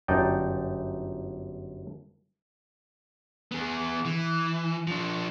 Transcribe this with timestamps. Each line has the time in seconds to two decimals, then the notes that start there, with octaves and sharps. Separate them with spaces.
0.08 G1 F#2 D4 D#4 D5 G5
3.52 B3 G#4
4.06 E3
4.88 F3 D4